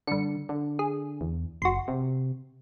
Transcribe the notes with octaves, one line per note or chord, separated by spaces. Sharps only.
G2 D3 C#7
D3
G#4
E2
F#1 F#4 C6
C3